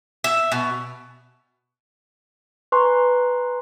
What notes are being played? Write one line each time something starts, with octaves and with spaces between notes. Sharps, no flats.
E5
B2
B4 G#5 A#5 C6 C#6